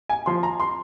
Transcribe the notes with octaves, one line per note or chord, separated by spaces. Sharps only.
G#5
F3 C6
A#5
C6